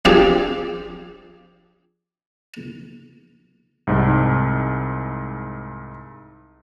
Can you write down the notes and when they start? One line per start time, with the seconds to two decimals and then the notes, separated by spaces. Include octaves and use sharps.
0.05 F3 C4 D4 G4 G#4 D5
3.87 C2 G#2